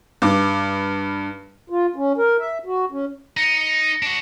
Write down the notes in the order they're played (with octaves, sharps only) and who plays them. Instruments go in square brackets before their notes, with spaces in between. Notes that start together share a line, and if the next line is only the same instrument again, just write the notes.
[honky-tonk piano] G2 D6
[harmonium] F4
C#4
A#4
E5
F#4
C#4
[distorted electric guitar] D#4 [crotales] A#6 C#7
[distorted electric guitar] D4 F#4